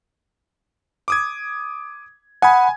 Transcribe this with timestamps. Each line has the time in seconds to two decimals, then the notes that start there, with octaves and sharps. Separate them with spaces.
1.08 D6 D#6 G#6
2.42 F#5 G#5 B5 D#6 G#6